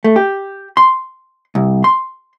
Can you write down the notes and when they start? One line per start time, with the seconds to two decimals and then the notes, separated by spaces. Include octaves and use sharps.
0.04 A3
0.16 G4
0.77 C6
1.55 C2
1.84 C6